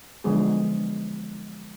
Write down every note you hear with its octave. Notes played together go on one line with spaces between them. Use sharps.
D3 F3 F#3 G#3 B3 G#4